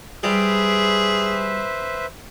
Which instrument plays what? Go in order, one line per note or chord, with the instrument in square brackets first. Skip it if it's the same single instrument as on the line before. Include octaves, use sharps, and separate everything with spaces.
[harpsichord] G3 [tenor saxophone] G#4 [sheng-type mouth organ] B4 C5 E5